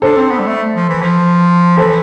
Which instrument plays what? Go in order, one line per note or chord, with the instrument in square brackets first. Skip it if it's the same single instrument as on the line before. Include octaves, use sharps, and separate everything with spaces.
[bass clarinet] D4 [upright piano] A4 C5
[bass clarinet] C4
B3
G3
A3
F3
E3
F3
[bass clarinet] E3 [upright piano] A4 C5